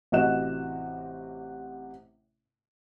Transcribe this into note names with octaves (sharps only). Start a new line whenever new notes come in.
A1 C3 F#4 D#5 F#6 E7